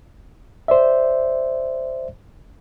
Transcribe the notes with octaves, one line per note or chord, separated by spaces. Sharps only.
C5 D5 E5